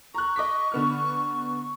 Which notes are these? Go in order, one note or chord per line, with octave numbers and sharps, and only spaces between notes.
A#5 C#6 F#6
D#5 D6 B6
D3 B3 F6